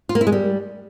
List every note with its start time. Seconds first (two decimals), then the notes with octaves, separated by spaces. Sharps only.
0.09 F4
0.15 A#3
0.21 E4
0.27 G#3
0.32 G3